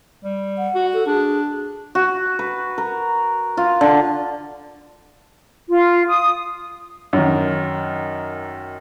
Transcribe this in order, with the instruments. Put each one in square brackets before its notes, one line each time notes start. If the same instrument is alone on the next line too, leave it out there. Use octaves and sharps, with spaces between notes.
[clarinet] G3
[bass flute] F#5
[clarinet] F#4
[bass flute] A4
[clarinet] D4 [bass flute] G#4
[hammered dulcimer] F#4
B4
A#4
F4
D3
[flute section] F4
D#6
[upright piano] F#2 D#3